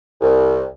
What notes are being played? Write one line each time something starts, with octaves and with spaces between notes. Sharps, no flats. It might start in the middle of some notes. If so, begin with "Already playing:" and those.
C2